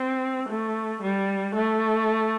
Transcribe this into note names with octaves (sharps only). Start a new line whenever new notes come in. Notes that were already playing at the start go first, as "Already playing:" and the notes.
Already playing: C4
A3
G3
A3